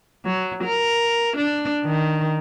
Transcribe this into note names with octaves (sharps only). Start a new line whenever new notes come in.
F#3
A#4
D4
D#3